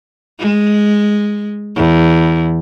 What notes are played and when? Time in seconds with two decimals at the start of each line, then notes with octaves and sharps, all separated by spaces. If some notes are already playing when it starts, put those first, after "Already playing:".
0.39 G#3
1.76 E2